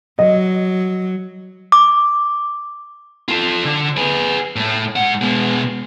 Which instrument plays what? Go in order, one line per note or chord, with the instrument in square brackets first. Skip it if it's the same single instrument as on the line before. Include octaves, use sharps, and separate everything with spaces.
[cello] F#3 [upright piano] D#5
[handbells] D6
[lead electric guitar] F4 A4
D3
G#4 B4
A2 A3
G#2 F#5
B2 G#3